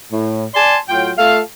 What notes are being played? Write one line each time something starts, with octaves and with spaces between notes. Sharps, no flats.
A2
D5 G#5 A5 C6
A2 F#3 F4 G5
A3 F4 A4 F5